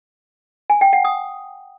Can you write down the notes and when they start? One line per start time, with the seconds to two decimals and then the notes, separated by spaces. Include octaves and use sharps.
0.70 G#5
0.81 G5
0.93 F#5
1.05 D#6